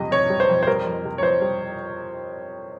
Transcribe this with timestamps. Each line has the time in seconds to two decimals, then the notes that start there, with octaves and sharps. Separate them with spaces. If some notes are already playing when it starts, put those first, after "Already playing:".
Already playing: F2 C3 G3 D#5
0.11 F2 C#5
0.30 G3
0.40 C5
0.49 F2
0.63 C5
0.67 G3 A#4
0.86 F2
1.05 C3
1.18 C#5
1.22 F2 C5
1.42 G3